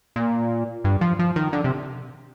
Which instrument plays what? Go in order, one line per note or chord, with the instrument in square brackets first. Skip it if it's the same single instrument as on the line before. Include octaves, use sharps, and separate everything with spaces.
[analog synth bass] A#2
G2
F3
F3
D#3
D3
C3